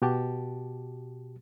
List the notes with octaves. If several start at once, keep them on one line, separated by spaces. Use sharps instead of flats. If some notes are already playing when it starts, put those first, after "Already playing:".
B2 F#4 G4 A5